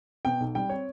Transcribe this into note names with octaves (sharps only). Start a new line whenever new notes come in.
B2 G5
B1
G3 G5
C4 C#5